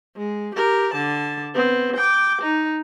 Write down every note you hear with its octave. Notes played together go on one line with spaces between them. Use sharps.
G#3
G4 A#4
D3 A5
B3 C4
G5 D6
D#4